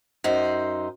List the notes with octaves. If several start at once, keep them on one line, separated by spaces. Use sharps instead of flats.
F#2 D#4 C5